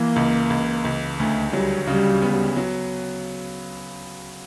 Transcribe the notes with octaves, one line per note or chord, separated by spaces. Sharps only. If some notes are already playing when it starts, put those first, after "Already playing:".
Already playing: E3 A#3
C#2
C#2
C#2
D2 A3
F#3 G3
C#3 G3
B3
F#3